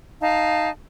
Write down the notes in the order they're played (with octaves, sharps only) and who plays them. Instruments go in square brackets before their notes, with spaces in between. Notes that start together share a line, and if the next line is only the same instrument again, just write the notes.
[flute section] D#4 F5 A5